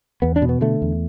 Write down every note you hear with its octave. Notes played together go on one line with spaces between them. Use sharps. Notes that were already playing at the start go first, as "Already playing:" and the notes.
E2 B3
D4
B2
B3
D3 A3
E2